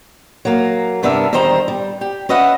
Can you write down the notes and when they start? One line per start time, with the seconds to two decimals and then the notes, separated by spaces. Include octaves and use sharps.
0.45 F#3 A#3
1.03 G2 C3 B3 D4 A#4 E5
1.33 E2 D#3 G3 C5 D#5 A#5
1.68 G3
2.01 G4
2.29 C#4 B4 D#5 E5 F#5